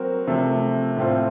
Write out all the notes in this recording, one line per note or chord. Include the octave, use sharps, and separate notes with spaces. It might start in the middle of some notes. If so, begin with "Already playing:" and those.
Already playing: F#3 C4 F#4 A#4
C3 F3 A3
A2 A3 C4 F4